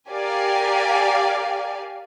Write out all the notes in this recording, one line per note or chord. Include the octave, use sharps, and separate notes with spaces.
G4 A#4 D5 F5 G#5